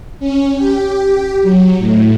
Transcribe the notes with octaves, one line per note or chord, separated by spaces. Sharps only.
C#4
G4
F#3
A2